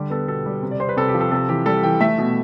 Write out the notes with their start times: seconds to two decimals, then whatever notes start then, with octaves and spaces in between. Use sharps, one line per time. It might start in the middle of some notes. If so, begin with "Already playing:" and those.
Already playing: D3 G3 G4
0.10 B3 A4
0.28 B2 A4
0.46 G3
0.63 C3
0.71 D5
0.80 C4 C5
0.89 B4
0.97 C3 A4
1.08 G4
1.14 F3
1.21 A4
1.31 C3 A4
1.49 E3 G4
1.66 G3 A4
1.83 E3 G5
2.00 A3 E5
2.18 B2